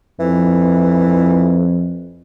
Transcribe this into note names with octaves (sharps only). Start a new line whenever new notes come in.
F2 E3